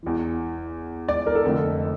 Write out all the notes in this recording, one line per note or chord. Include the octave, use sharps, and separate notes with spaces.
E2 E3
D5
A#4
A4
F1 F2 D3